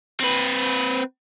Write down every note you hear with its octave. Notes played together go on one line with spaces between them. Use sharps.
C4 B4